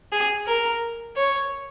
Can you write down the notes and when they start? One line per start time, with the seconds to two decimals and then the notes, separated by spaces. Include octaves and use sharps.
0.12 G#4
0.47 A#4
1.16 C#5